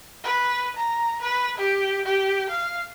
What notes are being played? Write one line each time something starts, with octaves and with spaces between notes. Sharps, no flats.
B4
A#5
B4
G4
G4
F5